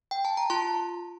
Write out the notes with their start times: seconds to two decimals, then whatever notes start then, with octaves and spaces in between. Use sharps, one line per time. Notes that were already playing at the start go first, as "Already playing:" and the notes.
0.11 G5
0.25 A5
0.37 A#5
0.50 F4 A5 C6